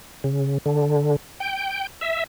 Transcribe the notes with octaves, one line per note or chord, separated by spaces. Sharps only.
C#3
D3
G5
E5